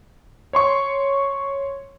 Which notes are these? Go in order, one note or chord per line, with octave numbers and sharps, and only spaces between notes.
C#5 C6 C#6